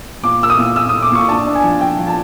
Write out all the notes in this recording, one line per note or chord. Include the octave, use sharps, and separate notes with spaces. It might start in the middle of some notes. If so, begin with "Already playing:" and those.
A#2 D6
A#3 E6
D#6
A#2
A#2 E6
A#2 D#6
D6
A#2 C#6
D4 A5
D4
G#5
F3
F3 G5
F3
A5